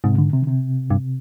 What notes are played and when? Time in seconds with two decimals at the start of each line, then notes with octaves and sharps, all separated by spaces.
0.04 G#2 C3
0.18 D3
0.33 C3
0.42 D3
0.47 C3
0.90 G2